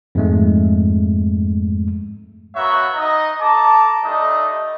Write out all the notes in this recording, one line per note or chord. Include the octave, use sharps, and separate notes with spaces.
F2 G#2 G#3 A3
A#3 B3 F#4 C#5 E5 C#6
D#4 D#5
A4 A5 A#5 D6
G3 A3 D4 D#4 D#5